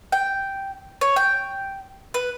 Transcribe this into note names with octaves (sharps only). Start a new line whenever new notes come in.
G5
C#5
G5
B4